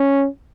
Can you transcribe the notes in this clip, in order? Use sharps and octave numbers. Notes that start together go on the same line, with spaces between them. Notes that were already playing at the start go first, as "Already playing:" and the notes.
Already playing: C#4